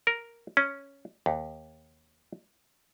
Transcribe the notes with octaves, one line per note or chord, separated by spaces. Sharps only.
A#4
C#4
D#2